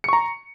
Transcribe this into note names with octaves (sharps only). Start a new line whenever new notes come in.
A#5 C#6 C#7